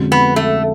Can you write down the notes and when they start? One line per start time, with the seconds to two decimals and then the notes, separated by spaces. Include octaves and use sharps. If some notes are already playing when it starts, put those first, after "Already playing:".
Already playing: F2 D3 G#3 C#4 F#4
0.12 B3
0.36 A3